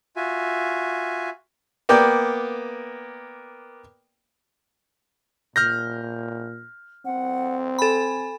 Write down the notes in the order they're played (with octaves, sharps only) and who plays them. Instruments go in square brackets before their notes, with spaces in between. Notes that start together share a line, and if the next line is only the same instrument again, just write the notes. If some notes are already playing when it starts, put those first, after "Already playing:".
[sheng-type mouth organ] F4 F#4 E5 G#5
[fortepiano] A#3 B3 D5 G5
[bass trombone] A#2 [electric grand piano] F6 G6 A#6
[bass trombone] C4 [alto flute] F#5
[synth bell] A4 B5 [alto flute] G#5